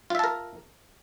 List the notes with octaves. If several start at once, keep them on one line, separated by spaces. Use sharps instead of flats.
F4 A#4 E5 A5